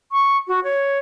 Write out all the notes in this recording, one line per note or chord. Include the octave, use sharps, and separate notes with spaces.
C#6
F#4
C#5